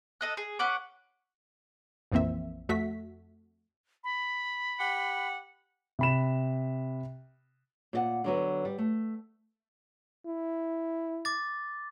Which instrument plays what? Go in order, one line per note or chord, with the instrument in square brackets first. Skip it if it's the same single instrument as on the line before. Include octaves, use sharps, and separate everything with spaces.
[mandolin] A4 D#5 F#6
G#4
C#4 B4 F#5 D6
[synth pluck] A#1 F2 E3 A#3 C4 E5
F2 A3 F#4 E5 B6
[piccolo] B5
[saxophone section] G4 F#5
[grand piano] C3 B5 E7
[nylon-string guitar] A#2 D5 F#5
D3 F#3 B3
G3
A3
[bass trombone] E4
[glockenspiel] D6 A6